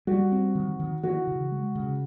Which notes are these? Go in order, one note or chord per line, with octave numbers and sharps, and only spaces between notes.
G3 F#4
C4
D#3
D#3
E3 F#4
C#3
G#3
C#3